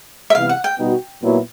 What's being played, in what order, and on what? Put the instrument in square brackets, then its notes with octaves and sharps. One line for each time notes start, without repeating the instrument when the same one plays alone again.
[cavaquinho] E5
[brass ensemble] C3 E3 G3 B3 E4 [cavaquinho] F5
[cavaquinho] F#5
G5
[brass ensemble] B2 G3 B3 D#4 F#4
A#2 F#3 B3 E4